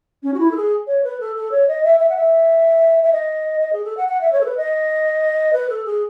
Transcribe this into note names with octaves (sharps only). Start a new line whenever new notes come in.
C#4
F#4
E4
A4
G#4
C#5
B4
A4
A4
C#5
D#5
E5
E5
F#5
E5
E5
D#5
D#5
G#4
A4
F#5
F#5
E5
C#5
A4
B4
D#5
B4
A4
G#4